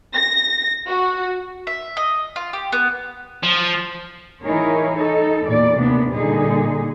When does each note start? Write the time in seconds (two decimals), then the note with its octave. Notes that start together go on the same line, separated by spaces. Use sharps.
0.14 A#6
0.86 F#4
1.67 E5
1.97 D#5
2.36 F4
2.53 G4
2.72 B3
3.43 F3
4.42 E3 D#4 E4 G#4 A#4 C#5
4.96 D#4 A4
5.47 E2 A#2 D5
5.78 D#2 C3 A#3 B3 D4
6.12 A#2 D3 G3 D#4 G#4